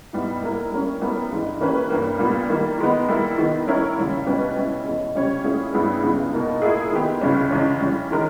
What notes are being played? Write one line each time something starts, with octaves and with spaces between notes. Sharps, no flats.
G#2 G3 B3 E4
G3 A#3 E4 A#4
G3 A#3 C#4
G3 B3 E4 A#4
G2 E3 G#3
E3 A#3 C#4 G4 B4
G2 G3 A#3
A#2 G3 B3
D#3 G3 A#3
D#3 G#3 B3
G3 A#3 E4
D#3 G#3 B3
G3 C#4 E4 A#4 C#5
D#2 C#3 G3
B2 G3 C#4 G4 B4
B2 G3 C#4 E4
E2 B2 G#3
C#3 G3 C#4 G4 C#5
A#2 G3 C#4 E4 G#4
G2 G3 B3 E4 G#4
C#2 C#3 G3 B3
B2 A#3 D#4
A#2 A#3 E4 G#4
D#3 G#3 B3 G4
C#2 C#3 G3 C#4
E2 C#3 G#3 C#4
E3 G3 C#4
D#3 G#3 D#4 A#4